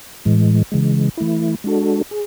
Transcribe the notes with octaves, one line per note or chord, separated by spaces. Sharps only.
A2 E3 G#3
C#3 E3 G#3
E3 A3 E4
G#3 D4 F#4 A4
G#4